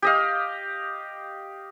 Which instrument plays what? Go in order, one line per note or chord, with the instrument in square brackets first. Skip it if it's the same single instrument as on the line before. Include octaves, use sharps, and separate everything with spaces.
[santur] G4 D#5 F5